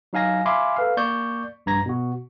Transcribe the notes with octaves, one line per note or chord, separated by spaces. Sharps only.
F#3 D#4 F5 G#5 A#6
E5 F5 G#5 B5 C6 D6
A4 B4 F5
A#3 D5 C#6 G6
A#1 G2 A#5 G#6 A#6
B2 F#4